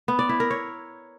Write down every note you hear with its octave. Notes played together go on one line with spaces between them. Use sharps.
B3
D5
E4
A#4
C#5